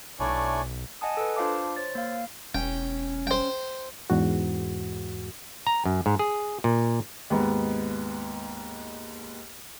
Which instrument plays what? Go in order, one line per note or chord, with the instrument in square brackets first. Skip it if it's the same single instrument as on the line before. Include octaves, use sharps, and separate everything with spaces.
[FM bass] B1 [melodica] A3 D4 E4 [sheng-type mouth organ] C#5 D5 G#5
[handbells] D#5 F#5 G#5 A5 D#6
A4 B4
D4 F4 C5 F5 A5 D6
C5 C#5 A6
A#3 F5
[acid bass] E1 [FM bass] C#4 [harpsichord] G5
[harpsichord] C5 G5
[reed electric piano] E2 G#2 F#4
[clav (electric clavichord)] A#5
F#2
G#2
G#4
A#2
[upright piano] D#2 G#2 B3